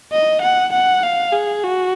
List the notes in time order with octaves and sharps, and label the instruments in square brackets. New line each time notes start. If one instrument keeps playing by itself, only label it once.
[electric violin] D#5
F#5
F#5
F5
G#4
F#4